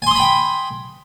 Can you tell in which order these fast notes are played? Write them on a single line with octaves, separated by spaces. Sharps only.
G#5 C6 D#6 B5 G5